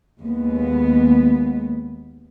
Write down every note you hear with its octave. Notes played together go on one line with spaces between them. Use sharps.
D#2 G#3 B3